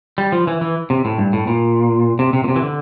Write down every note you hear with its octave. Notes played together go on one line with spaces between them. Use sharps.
G3
F3
E3
E3
C3
A2
G2
A2
A#2
C3
C3
A#2
C3
E3
D3